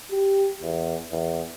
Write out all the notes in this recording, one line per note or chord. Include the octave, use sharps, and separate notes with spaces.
G4
E2
E2